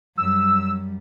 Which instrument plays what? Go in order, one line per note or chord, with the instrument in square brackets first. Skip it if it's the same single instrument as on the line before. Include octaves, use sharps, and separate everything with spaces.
[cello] F#2 G3 [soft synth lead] E6